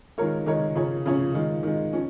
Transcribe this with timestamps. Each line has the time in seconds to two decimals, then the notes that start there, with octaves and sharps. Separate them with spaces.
0.18 D#3 G#3 F4 A#4 C#5
0.46 D#3 G#3 F4 A#4 C#5
0.75 C#3 F3 C#4 F4 C#5
1.06 C#3 F3 C#4 F4 C#5
1.34 D#3 G#3 F4
1.63 D#3 G#3 F4
1.93 F3 C#4